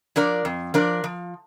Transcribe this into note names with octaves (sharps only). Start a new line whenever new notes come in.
F3 D4 A#4 D5
F2
F3 D4 A#4 D5
F3